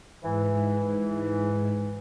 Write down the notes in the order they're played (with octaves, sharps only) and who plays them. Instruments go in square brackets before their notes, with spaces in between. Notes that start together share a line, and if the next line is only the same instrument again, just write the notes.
[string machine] G#2 [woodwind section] E3